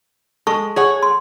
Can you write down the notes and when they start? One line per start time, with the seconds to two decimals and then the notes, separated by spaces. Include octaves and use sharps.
0.47 G#3 A4 A5 C#6
0.76 G#4 C#5 F#5
1.03 C6